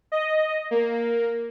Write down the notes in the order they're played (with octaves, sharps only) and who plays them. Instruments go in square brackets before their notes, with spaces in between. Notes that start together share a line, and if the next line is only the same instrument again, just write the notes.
[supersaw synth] D#5
A#3